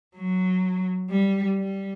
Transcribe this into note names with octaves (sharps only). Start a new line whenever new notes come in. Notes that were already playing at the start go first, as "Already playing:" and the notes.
F#3
G3
G3